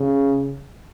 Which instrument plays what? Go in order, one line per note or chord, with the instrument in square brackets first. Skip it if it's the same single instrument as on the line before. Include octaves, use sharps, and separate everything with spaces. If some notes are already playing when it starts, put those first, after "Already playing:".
Already playing: [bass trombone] C#3